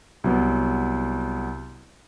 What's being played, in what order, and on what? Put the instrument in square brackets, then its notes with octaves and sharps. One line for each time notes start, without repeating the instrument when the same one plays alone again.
[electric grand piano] C2 F#3 B3